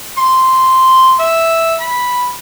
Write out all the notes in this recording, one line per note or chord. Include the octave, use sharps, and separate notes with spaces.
C6
E5
B5